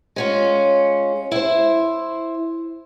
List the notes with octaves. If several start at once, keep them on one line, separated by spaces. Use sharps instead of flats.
G#3 C#4 F4
E4 C5